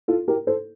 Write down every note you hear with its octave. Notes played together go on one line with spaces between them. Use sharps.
F4 A4
G4 A#4
A4 C5